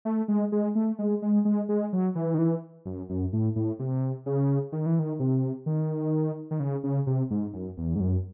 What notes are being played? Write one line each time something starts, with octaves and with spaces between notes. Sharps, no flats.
A3
G#3
G#3
A3
G#3
G#3
G#3
G#3
F#3
E3
D#3
E3
F#2
F#2
A2
A2
C3
C#3
D#3
E3
D#3
C3
D#3
D#3
C#3
C#3
C3
G#2
F#2
E2
G#2
F#2